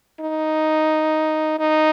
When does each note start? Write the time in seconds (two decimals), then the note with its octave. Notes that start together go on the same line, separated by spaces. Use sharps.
0.20 D#4
1.59 D#4